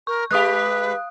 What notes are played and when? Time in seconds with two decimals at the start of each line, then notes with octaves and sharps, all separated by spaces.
0.07 A#4 C#6
0.31 G#3 G4 B4 F5 D#6 F#6